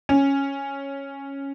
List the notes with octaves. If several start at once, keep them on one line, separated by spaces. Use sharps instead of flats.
C#4